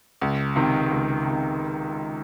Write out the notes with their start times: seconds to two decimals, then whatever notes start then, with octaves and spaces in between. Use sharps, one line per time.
0.21 C#2
0.56 C3 D#3
0.91 C#2
1.27 C3 D#3